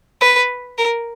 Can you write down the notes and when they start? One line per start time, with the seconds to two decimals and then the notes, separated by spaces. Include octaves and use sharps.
0.21 B4
0.78 A#4